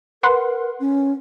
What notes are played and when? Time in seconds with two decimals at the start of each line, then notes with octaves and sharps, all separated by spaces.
0.23 A#4 B4 F#5 C6
0.80 C#4